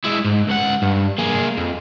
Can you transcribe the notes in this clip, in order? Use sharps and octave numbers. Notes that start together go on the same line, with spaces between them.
G#3 E4
G#2
C#2 F#5
G2
A#3 G#4
F2